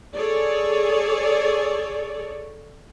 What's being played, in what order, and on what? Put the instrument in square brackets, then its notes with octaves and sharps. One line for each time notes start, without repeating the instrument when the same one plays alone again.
[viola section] G#4 A4 C#5 D5